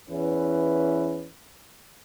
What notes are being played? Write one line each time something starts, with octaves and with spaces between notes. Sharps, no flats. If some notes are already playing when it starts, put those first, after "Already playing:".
E2 E3 C#4 B4